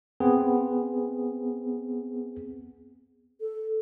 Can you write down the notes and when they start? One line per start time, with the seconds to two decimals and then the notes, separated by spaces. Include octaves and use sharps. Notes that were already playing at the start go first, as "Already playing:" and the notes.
0.20 B3 C4 G#4
3.41 A4